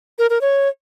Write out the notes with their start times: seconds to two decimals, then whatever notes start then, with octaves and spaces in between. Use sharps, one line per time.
0.19 A#4
0.30 A#4
0.41 C#5